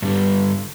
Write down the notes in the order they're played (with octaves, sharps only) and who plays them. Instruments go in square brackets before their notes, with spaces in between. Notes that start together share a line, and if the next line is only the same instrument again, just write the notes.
[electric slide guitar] G2 D3 G3